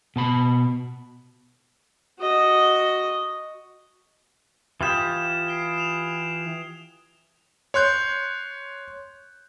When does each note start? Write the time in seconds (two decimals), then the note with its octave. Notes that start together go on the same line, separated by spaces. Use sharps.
0.16 B2 A5 B5
2.19 F#4 D#5
4.81 E3 F4 G4 D#6 G#6 E7
5.48 C7 D7 G7
5.78 E7 F7
7.74 C#5 C6 F#6 G6